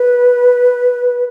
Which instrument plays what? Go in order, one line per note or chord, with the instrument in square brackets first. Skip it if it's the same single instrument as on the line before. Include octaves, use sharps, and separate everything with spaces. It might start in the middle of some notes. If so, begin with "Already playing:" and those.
Already playing: [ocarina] B4